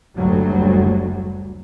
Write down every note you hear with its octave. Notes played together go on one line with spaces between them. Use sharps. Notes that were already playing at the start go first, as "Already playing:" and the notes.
F#1 D2 F#3 G3